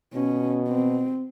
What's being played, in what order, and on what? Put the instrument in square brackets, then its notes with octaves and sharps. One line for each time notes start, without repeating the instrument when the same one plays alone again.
[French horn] B2 [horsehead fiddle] C#4
[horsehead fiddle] C4